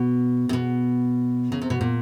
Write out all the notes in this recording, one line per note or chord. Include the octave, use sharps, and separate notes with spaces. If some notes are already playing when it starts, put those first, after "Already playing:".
Already playing: B2
C3
B2
C#3
C3
B2
A#2